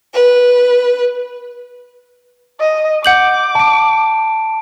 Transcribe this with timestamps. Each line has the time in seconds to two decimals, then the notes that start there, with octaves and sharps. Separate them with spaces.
0.13 B4
2.60 D#5
3.05 F#5 D6 G6 F#7
3.55 A5 D7